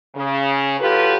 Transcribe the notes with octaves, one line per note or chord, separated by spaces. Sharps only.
C#3
F#3 F4 G4 A4 B4